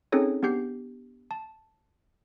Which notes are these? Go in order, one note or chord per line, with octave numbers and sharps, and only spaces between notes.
C4 C#4 D#4 G#4 A4 C#5
B3 D4 G4 G6 C7
A5